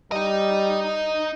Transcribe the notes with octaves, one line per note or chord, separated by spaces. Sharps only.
G3 D#4 D#5